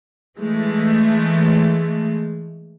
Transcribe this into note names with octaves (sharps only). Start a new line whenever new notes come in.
E3 G#3 A3